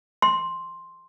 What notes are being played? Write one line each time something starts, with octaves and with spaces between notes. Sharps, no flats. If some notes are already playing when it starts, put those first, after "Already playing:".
C6